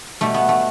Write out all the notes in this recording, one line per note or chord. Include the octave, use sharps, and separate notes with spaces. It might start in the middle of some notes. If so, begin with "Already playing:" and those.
B2 G3 A3
B3
A3